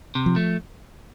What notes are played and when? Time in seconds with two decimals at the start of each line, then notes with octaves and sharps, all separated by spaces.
0.15 C3
0.26 F3
0.36 A3